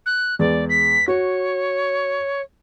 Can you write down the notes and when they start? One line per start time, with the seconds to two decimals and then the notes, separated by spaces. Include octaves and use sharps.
0.06 F#6
0.39 E2 G#3 D5
0.69 B6
1.08 F#4 C#5